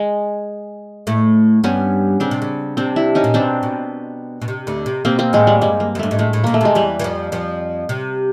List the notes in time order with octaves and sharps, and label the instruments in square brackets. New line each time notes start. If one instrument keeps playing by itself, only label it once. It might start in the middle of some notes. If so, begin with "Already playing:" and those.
Already playing: [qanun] G#3
[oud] A2 A3
[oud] G2 G3 [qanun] B3 C#4
[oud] C#3 [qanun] C4 D4
[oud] C3
C#3
[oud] C3 [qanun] C4 D4
[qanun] D4 E4
C#4 D#4
[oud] A#2
[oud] B2 [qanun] C4 D4
[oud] B2
B2
C3
D2 D3
C3
[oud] B2 [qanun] A#3 C4
[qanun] A#3 C4
[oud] A2 [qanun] G#3
[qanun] G3
[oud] G2 [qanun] G#3
[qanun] A#3
[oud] F#2
[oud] G2 [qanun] A3
[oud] G#2
[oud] A2 [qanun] G#3
[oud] A2
[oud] A#2 [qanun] A#3
[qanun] A3
[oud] C3 [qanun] G#3
[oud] E2 E3 [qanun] G3
[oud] E3
F2 F3
F2 F3
C3